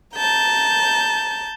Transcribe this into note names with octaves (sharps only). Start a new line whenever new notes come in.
A5 A#5 G6